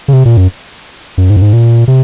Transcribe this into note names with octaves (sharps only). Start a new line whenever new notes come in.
C#3
C3
A#2
F#2
F#2
G#2
F#2
G#2
A#2
C3